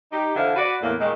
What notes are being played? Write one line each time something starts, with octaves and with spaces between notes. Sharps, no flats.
D#4 G4
F2 D3 E3 E4 C5 F5
F#4 B4 D5
E2 A2 A#3
A#2 D#3 G#3